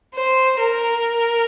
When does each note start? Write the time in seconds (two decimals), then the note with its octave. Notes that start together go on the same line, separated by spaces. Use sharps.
0.15 C5
0.60 A#4